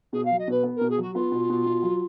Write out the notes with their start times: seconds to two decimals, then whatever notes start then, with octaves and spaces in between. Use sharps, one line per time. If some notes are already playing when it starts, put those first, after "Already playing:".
0.13 B2 G#4
0.25 F5
0.31 F#3
0.39 D#5
0.48 B2 B4
0.63 B3
0.76 B2 A#4
0.90 G#4
0.98 F#3 F#4
1.15 B3 F4
1.32 B2
1.49 B2
1.66 B2
1.82 F#3